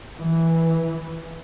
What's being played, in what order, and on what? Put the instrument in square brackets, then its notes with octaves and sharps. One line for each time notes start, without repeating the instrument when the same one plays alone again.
[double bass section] E3